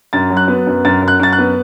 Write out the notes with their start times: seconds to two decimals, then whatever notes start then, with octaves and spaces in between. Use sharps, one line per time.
0.13 F#2 A6
0.30 F#3
0.37 F#6
0.48 B3
0.67 F#2
0.85 F#2 A6
1.02 F#2
1.08 F#6
1.19 F#2 A6
1.32 F#6
1.38 B3